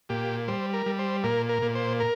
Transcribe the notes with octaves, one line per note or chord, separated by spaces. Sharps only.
A#2 G4
G3 C5
A#4
G3
C5
A#2 A#4
A#4
A#2
C5
A#4